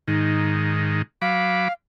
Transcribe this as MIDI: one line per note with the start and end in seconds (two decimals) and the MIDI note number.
0.08 1.02 44
0.08 1.02 51
0.08 0.93 63
1.22 1.68 54
1.22 1.73 77
1.22 1.68 83
1.22 1.68 86